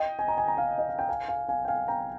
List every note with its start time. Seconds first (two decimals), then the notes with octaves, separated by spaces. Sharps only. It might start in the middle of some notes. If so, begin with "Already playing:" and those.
Already playing: D#5 G5
0.19 G#5
0.28 A#5
0.38 G#5
0.48 A#5
0.57 F5 G#5
0.78 D#5
0.89 F5
0.99 G5
1.09 F5 G#5
1.29 F5 G#5
1.49 F5 G#5
1.65 G5
1.68 F5 G#5
1.88 G5 A#5